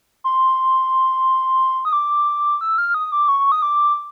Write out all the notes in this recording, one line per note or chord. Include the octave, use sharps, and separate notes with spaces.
C6
D#6
D6
E6
F6
D#6
D6
C#6
D#6
D6